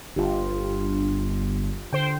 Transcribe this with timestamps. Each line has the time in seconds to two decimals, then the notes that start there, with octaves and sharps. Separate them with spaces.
0.16 G1 F4 G4
1.93 D3 C5 G5